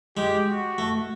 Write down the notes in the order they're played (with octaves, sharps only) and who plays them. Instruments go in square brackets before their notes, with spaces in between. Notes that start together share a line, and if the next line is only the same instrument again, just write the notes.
[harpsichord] G#3 [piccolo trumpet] G4
[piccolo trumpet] F#4
[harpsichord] A3